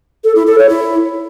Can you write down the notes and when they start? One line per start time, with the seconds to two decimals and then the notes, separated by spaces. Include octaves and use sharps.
0.24 A4
0.35 E4
0.47 A4
0.58 C#5
0.69 E4